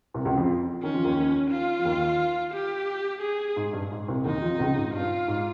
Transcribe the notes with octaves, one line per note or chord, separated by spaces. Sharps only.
C2 C3
C#2 C#3
F2 F3
D#3 C#4
F3
D#2 D#3
F4
F3
D#2 D#3
G4
G#4
G#2
G2
G#2
C2 C3
D#2 D#3 D#4
F2 F3
C#2 C#3
G#2
G2 F4
G#2